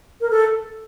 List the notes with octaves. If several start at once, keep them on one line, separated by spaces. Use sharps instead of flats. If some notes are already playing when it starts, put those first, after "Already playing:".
A#4
A4